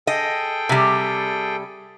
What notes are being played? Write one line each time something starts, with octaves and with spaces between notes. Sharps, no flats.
G#4 A4 D#5 G5
C3 G3